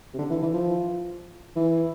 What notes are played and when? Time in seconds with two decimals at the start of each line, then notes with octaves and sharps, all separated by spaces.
0.14 C3
0.19 D3
0.30 E3
0.42 E3
0.54 F3
1.56 E3